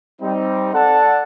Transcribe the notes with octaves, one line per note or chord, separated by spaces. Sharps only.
G3 C4 D#4
A4 D5 F#5 A5